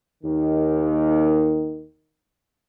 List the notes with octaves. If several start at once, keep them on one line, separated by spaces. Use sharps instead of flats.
D#2 D#3